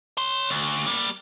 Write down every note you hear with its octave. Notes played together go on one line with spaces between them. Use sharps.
C#5 C6
D2
G3 A#3